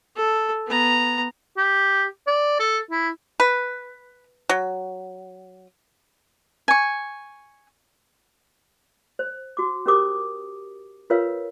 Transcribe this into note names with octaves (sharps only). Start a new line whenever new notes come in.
A4
B3 A#5
G4
D5
A4
E4
B4
F#3
G#5 C#6
C5
F#4 D6
C#4 G4 A#4 C5 D6 D#6
F4 A#4 B4 C#5 F5